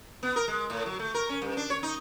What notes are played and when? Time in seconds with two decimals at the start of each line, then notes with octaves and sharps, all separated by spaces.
0.23 B3
0.36 A#4
0.48 G#3
0.70 A2
0.86 F#3
0.99 A3
1.14 A#4
1.29 C#4
1.42 G2
1.57 D4
1.70 C#5
1.83 D#4